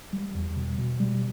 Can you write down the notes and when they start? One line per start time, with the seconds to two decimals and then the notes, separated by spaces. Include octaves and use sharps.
0.13 G3
0.35 E2
0.56 B2
0.79 B2
1.00 G3